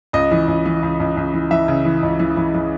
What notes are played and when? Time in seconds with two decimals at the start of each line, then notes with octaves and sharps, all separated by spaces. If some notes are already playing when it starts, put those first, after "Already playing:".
0.13 C#2 D#5
0.31 E3
0.48 C#2
0.66 E3
0.83 C#2
1.00 C#2
1.17 C#2
1.34 E3
1.51 E3 E5
1.68 C#3
1.85 E3
2.03 C#2
2.19 E3
2.37 E3
2.54 E3